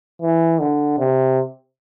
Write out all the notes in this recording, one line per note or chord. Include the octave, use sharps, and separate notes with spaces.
E3
D3
C3